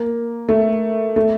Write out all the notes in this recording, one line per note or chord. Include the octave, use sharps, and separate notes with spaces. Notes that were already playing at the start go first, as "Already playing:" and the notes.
Already playing: A#3
A3
A3